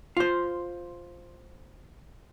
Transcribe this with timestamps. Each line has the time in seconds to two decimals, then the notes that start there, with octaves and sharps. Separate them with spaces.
0.17 F4 C5